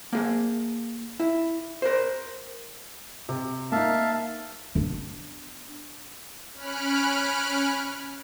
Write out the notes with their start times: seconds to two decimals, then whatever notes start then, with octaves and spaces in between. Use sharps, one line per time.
0.13 A#3 G#4
1.20 E4
1.82 A#4 C5
3.29 C3
3.72 A#3 D#4 E5 F5 A5
4.75 B3 D4
6.54 C#4 B5 F6 F#6 D7